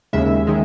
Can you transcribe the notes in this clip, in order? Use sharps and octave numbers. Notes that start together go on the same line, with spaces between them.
D#2 C#3 G#3 E5
D#3 G#3